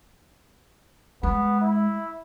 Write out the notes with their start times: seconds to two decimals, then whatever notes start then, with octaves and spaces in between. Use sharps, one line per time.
1.23 G#3 B3
1.61 E4